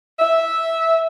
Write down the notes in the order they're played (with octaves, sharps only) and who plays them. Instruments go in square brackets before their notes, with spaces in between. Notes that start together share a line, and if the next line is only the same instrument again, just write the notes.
[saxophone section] E5